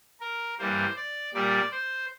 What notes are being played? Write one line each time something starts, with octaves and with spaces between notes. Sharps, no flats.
A#4
G2 E3 G3 A#3 C5
D5
A#2 G3 A#3 D5
C5